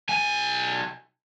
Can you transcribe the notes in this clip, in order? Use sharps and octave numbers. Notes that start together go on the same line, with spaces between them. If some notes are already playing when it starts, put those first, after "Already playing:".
B1 G#5